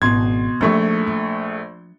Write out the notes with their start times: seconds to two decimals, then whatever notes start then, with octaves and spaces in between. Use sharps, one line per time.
0.02 G#1 B2 E4 C6 G#6
0.61 A#1 F3 A3 D#4 C#6
1.07 F3